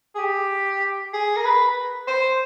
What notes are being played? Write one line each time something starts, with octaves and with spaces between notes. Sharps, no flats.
G#4
G4
G#4
A#4
B4
C5